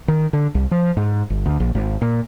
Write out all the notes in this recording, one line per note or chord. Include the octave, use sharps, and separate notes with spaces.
D#3
D3
C2
F3
G#2
G1
D2
A#1
G#1
A#2